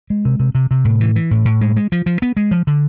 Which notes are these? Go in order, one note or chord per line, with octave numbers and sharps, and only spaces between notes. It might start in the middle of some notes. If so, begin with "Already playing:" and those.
G#3
C3
C3
C3
C3
A2
E3
E3
A2
A2
G#3
G#3
F3
F3
B3
G#3
F3
D3